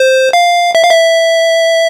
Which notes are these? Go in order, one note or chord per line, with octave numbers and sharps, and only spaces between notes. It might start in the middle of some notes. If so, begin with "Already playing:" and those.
Already playing: C5
F5
E5
F5
E5